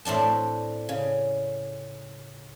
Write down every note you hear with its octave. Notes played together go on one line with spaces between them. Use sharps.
A2 C4 D4 A5
C#3